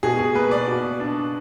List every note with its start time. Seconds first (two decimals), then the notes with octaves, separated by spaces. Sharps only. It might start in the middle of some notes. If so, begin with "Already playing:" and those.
0.03 B2 G#4
0.19 G#4
0.34 A#3 B4
0.51 D5
0.68 B2
1.00 D4